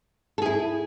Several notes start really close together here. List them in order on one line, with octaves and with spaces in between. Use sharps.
A4 G#4 E4